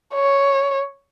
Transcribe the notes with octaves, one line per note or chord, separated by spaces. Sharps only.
C#5